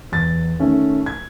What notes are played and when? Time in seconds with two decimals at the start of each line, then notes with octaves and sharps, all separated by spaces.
0.12 E2 A6
0.59 D#3 A3 C#4
1.06 G#6